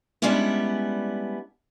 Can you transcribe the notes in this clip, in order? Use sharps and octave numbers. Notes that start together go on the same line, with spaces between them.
G3 G#3 B3 C#4 D4 E4